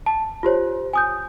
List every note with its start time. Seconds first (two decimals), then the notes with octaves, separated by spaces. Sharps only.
0.06 A5
0.43 F4 G4 C5 C#5
0.93 G#5 D#6 G6